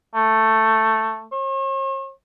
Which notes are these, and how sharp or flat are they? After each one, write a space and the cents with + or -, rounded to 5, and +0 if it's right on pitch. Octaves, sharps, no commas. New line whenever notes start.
A3 +5
C#5 -45